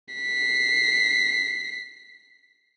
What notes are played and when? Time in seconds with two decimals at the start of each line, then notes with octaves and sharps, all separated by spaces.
0.14 B6 C7